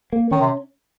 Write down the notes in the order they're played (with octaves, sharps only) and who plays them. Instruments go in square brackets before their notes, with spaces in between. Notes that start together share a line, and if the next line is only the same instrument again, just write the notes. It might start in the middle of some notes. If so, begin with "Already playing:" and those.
[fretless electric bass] A#3
[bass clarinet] D#3 [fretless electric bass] C#4
[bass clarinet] C3